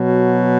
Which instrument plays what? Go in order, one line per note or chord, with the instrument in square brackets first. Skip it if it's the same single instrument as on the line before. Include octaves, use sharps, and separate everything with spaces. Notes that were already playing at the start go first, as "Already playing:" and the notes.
Already playing: [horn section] B2 F#3